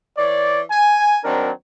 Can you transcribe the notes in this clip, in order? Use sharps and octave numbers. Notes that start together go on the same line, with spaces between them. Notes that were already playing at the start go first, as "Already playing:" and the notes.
E3 C#5 D5
G#5
D#3 F#3 C4 D4 A#4